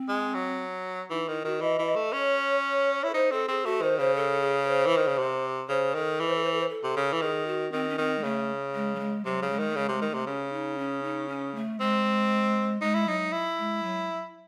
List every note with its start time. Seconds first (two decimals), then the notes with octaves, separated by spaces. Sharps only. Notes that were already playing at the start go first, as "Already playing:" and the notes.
Already playing: C4
0.09 G#3
0.34 F#3
1.10 E3 D#4
1.28 D#3 E4
1.44 D#3 F#4
1.61 E3 D#5
1.79 E3
1.87 D#5
1.95 A3
2.13 C#4 C#5
3.04 E4
3.09 A4
3.14 D#4 C5
3.31 C4 A4
3.48 C4 G#4
3.65 A3 F#4
3.82 D#3 C5
3.98 C#3 C5
4.15 A4
4.41 G#4
4.67 C5
4.86 E3
4.97 D#3
5.07 C#3
5.18 C3
5.68 C#3 C5
5.94 D#3 A4
6.19 E3 A4
6.28 C5
6.35 A4
6.44 C5
6.53 A4
6.60 C5
6.68 A4
6.83 C3
6.96 C#3
7.13 E3
7.21 D#3 G#4
7.47 F#4
7.72 D#3 C4
7.89 C#4
7.98 D#3 C4
8.18 G#3
8.23 C#3 A3
8.74 G#3
8.95 F#3
8.99 G#3
9.25 C3 F#3
9.42 C#3
9.50 G#3
9.59 D#3
9.69 A3
9.76 C#3 G#3
9.89 C3 G#3
10.02 D#3
10.09 C3 A3
10.27 C#3 C#4
10.52 D#4
10.78 C#4
11.03 D#4
11.28 C#4
11.55 A3
11.80 G#3 C4
12.81 G#3 D#4
12.94 E4
13.07 F#3 D#4
13.32 E4
13.58 G#3
13.83 F#3